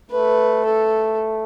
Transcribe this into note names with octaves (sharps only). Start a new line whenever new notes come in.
A3 B4
A4